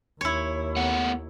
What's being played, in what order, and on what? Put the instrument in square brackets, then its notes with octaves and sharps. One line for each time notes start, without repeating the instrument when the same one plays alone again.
[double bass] D#2 [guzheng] E4 C#5
[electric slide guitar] A3 B3 F#5